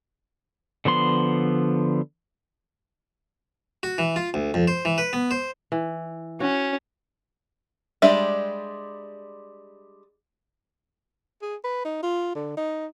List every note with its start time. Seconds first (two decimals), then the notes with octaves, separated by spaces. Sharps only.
0.85 D3 F3 B3 C6
3.83 F#4
3.98 E3
4.16 F4
4.34 D2
4.54 F2
4.68 C5
4.85 E3
4.98 B4
5.13 B3
5.31 C5
5.72 E3
6.40 C#4 F#4
8.02 G3 G#3 D4 G4 E5
11.42 G#4
11.64 B4
11.85 D#4
12.03 F4
12.35 D3
12.57 D#4